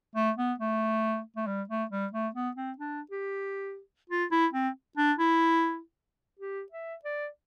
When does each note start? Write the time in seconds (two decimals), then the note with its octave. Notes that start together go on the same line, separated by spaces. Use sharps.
0.15 A3
0.38 B3
0.60 A3
1.36 A3
1.47 G3
1.69 A3
1.91 G3
2.13 A3
2.35 B3
2.56 C4
2.78 D4
3.11 G4
4.09 F4
4.31 E4
4.53 C4
4.97 D4
5.18 E4
6.39 G4
6.72 E5
7.05 D5